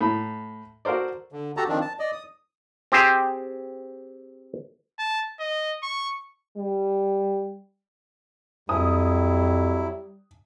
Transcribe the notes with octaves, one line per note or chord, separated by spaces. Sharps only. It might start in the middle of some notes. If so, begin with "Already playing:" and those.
A2 A#5 B5
F#4 A4 A#4 C5 D5
D3
F#4 G4 A4 A5 A#5
D#3 F3 C4 D4
A5
D5 D#5
D#6
C4 G4 G#4 C5
A5
D#5
C#6
G3
F2 F#3 G3 E4 D#6